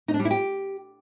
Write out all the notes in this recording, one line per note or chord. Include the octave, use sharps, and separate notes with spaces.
D#4
D4
G3
E4
G4